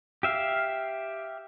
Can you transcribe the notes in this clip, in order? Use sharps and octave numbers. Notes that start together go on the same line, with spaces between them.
G4 E5 F5